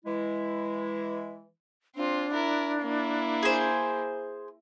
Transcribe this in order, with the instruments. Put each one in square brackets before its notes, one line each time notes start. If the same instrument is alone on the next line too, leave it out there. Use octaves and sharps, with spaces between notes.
[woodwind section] E3 G#3 E4
[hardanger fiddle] C4 F4 [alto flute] D4
[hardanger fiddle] E4 A#4
A#3 E4
[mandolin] G#4 C5